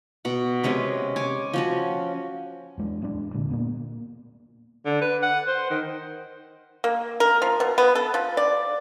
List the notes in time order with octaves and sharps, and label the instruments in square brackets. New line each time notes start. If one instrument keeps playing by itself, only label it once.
[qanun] B2 F#5
C3 G#3 C#4 B4
C#5 G#5 D6
F3 C#4 F#4
[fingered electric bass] E2 G#3 D4
A1 E2 G#3 D4
G2 A#2 D3
A#2 A#3 B3 D4
[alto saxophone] D3
B4
F#5
C5
D#3
[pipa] A#3
A#4
F3
B2
B3
A4
F3
D5